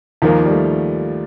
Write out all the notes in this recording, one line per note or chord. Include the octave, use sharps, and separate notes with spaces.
D#2 D#3 F3 A#3
G3
A3